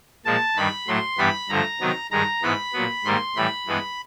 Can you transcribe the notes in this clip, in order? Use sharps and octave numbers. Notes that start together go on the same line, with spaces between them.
A#2 F3 G#3 A5
G2 D#3 G3 B5
A2 F#3 A3 C6
G2 E3 G3 B3 B5
G2 D3 F3 A3 A#5
C3 D#3 F#3 B3
G2 D#3 G#3 A#5
G#2 E3 G#3 B3 B5
A#2 F#3 B3
G#2 D#3 G3 A#3 C6
A2 E3 G3 B5
G2 E3 G#3 B3